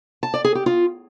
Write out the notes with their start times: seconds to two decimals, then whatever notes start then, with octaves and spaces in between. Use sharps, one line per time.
0.23 A5
0.34 D5
0.44 G#4
0.55 G4
0.66 F4